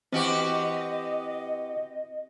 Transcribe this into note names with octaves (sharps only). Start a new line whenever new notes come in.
E3 C4 F#4 G4 D#5